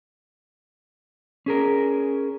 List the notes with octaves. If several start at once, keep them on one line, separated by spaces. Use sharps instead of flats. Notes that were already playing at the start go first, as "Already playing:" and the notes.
C#4 G#4 A#4